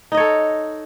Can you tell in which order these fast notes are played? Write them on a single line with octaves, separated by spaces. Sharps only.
D#4 D#5 C#5 A4